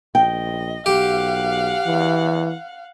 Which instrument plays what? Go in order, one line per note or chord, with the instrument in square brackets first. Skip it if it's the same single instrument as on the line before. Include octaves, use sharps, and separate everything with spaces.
[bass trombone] A#1 [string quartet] D#5 [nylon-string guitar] G5
[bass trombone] B1 [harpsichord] G4 [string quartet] F5 F#5
[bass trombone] E3